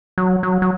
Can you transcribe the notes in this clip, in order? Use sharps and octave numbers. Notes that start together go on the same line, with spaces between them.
F#3
F#3
F#3